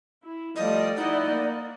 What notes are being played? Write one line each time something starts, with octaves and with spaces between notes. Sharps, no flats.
E4
F3 G3 A3 D5 D#5
D#4 E4 D#5 F#5
A#3